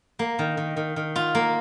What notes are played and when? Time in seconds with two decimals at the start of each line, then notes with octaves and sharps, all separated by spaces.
0.19 A#3
0.39 D#3
0.57 D#3
0.77 D#3
0.96 D#3
1.16 F4
1.35 A#3